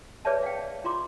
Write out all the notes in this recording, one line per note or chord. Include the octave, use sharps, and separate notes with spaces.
G#4 B4 C#5 D5 E5 A5
F5 G5
F4 A#5 C6 D6